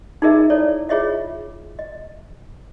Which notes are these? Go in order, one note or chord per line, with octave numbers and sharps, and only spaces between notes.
D#4 F4 G#4 A#4 D#5 E5
E4 A4 C#5 D5
F4 G#4 C#5 D#5 E5
D#5